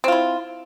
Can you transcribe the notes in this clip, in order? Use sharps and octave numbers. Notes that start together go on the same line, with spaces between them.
C4 E4 F4